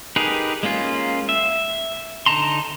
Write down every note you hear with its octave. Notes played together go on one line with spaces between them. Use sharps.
D#4 G4 G#4 A#4 B4
G#3 A#3 C#4 F4
E5
D3 D#4 A5 A#5 C6